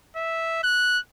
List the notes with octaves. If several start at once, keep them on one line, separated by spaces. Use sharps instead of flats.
E5
F#6